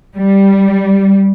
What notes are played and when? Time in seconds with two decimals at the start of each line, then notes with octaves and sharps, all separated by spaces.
0.16 G3